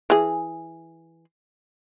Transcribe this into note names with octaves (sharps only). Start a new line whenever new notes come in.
E3 G#4